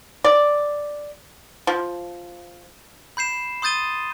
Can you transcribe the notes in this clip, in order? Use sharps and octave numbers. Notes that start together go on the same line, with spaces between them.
D5
F3
B5 G6 C7 E7
C6 D#6 G6 A6 D#7 G7